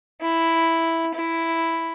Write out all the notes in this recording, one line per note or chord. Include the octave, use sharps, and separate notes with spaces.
E4
E4